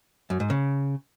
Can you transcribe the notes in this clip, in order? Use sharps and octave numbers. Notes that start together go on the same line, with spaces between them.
F#2
G#2
C#3